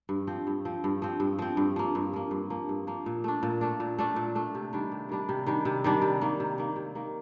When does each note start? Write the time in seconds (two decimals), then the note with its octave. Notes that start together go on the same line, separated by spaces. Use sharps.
0.09 G2
0.27 F3 C4
0.47 G2
0.65 F3 C4
0.84 G2
1.02 F3 C4
1.20 G2
1.39 F3 C4
1.57 G2
1.76 F3 A#3
1.95 G2
2.13 F3 A#3
2.31 G2
2.50 F3 A#3
2.69 G2
2.87 F3 A#3
3.06 A#2
3.24 A3 D4
3.43 A#2
3.61 A3 D4
3.80 A#2
3.99 A3 D4
4.16 A#2
4.35 A3 D4
4.55 C3
4.73 D#3 G3 D4
4.92 C3
5.09 D#3 G3 D4
5.29 C3
5.46 D#3 G3 D4
5.65 C3
5.84 D#3 G3 D4
6.02 C3
6.21 D#3 A#3
6.40 C3
6.58 D#3 A#3
6.76 C3
6.95 D#3 A#3